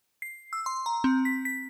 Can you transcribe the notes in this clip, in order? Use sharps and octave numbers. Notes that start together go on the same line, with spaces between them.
C7
E6
C6
A#5
C4
B6
B6